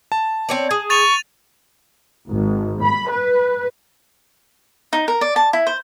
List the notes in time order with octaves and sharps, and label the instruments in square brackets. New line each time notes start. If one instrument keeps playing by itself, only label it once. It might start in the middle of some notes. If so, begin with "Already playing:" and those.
[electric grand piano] A5
[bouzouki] C4 C#5 D5
G#4
[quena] C#6 [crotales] A6 D#7 F7
[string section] G#1
B5
B4
[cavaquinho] D#4
A#4
D5
A5
E4
C5